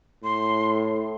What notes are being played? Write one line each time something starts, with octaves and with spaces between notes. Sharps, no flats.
A2 C6